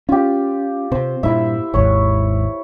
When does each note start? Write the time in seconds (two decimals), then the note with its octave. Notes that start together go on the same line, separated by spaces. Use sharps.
0.09 C#4 F4 G4
0.92 C3 C5
1.23 G2 A#2 E4 E5
1.74 G#1 D#2 G#2 C#5